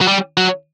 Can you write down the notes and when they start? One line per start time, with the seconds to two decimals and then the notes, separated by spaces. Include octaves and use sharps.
0.01 F#3
0.08 G3
0.37 F#3